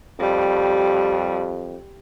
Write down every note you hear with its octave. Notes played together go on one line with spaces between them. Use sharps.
F2 G3